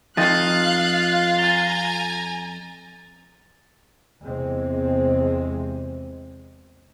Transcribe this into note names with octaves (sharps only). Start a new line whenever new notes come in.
F2 D#4 F4 F5 F#6 A6
G#5 A#5 A6 F7 G7
E2 C3 G#3 C4